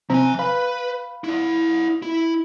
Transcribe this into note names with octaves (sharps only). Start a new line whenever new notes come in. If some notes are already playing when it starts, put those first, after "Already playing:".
C3 F3 C4 G#5 A#5
B4 F5 B5
E4 D5
E4